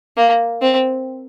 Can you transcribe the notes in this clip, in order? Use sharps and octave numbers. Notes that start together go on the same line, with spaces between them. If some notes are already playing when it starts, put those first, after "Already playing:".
A#3
C4